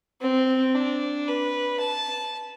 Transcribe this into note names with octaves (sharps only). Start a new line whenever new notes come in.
C4
D4
B4
A5